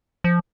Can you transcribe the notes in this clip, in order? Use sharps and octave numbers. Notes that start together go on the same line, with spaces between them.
F3